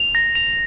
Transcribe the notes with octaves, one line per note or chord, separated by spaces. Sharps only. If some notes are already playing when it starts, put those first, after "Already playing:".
Already playing: F7
A#6
F7